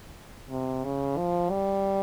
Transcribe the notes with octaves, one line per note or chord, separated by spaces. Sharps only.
C3
C#3
F3
G3